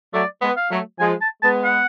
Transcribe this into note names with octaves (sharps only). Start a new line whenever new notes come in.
F#3 A3 D5
G#3 B3
F5
F#3 A3
F3 G#3 G#5
A5
G#3 B3 A5
F#5